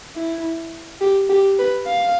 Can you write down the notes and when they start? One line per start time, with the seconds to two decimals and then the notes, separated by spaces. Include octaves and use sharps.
0.16 E4
1.01 G4
1.30 G4
1.59 B4
1.86 F5